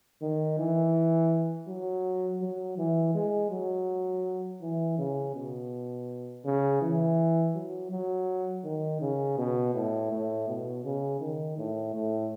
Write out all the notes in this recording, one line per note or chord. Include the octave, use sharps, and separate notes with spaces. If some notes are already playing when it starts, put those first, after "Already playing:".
D#3
E3
F#3
F#3
E3
G#3
F#3
E3
C#3
B2
C#3
E3
F#3
F#3
D#3
C#3
B2
A2
A2
B2
C#3
D#3
A2
A2